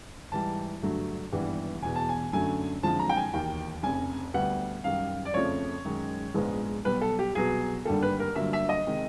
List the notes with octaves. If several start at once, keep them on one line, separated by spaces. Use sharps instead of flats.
G#2 E3 G3 A5
G2 D3 F#3 A3
G#1 G2 E3 G3 B3
E1 E2 B2 G#5
A5
G#5
F#2 D3 F#3 A3 C#4 G#5
F#1 F2 D3 F3 G#3 A5
A#5
G5
G#5
E1 D#2 D#3 G5
F1 F2 C#3 G#5
D2 D3 G3 B3 F#5
F#2 D#3 G3 F5
D5
F2 C#3 F3 A3 C#5
F#2 D#3 G#3
A#1 G#2 F3 G#3 B3
B1 B2 G3 B4
A4
G4
C2 B2 F#3 B3 G#4
G#1 G2 D3 G3 A#3 A4
B4
A#4
G1 G2 D3 F#3 A#3 E5
E5
D#5
C3 D#3 G#3